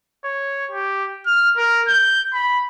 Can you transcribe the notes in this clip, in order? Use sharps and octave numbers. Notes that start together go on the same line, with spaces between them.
C#5
G4
F6
A#4
G6
B5